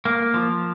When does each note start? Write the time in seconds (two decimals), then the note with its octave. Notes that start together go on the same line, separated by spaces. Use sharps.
0.05 A#3
0.34 F3